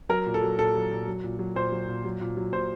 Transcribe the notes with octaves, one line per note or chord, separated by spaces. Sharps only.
F#3 A#4
A#2
A4
F#3
A#2 A4
F#3
A#2
F#3
A#2
F#3
A#2 C5
F#3
A#2
F#3
A#2
F#3
A#2 C5